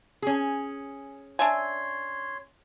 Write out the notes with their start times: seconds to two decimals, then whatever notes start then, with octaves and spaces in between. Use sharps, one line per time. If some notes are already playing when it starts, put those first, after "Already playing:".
0.22 C#4 G#4
1.39 D4 C#5 E5 G#5 C6